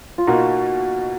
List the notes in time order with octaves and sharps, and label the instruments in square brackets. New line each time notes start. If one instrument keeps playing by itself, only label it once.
[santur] F4
[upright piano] B2 A#3 D#4 [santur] F#4